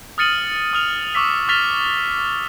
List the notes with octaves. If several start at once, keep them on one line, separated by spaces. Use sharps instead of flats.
D#6 F6 A6 C#7 D#7 F#7
D#6 F6 F7
C#6 D6 E6 B6
C#6 F6 A6 B6 F7 G7